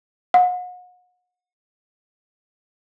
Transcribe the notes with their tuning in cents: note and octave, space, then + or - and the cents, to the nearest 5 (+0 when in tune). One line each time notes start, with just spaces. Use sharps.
F#5 -40